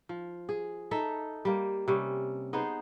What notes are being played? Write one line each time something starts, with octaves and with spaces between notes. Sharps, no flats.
F3
G#4
D#4 A4 E5
G3 A#3
C3 G3 C#4
B3 D#4 G#4 C5